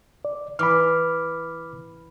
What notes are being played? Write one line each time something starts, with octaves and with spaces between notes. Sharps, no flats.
D5
E3 B5 D6 F6